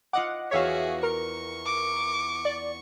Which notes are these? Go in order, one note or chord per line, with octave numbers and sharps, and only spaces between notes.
F4 D#5 F#5 D6
E2 F#4 G#4 C#5 E5 F5 B6
A#4 C#6
D6
D5